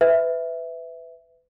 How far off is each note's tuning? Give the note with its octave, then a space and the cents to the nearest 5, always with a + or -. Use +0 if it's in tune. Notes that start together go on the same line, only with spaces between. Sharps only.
B4 +20 E5 +0